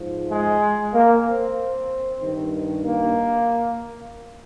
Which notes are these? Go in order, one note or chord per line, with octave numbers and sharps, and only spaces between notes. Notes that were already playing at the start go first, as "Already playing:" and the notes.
Already playing: G#2 F3
G#3
A#3
C4
G2 D#3
A#3